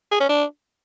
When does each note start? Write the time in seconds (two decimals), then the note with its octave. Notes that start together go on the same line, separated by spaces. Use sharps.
0.11 G#4
0.20 C#4
0.29 D4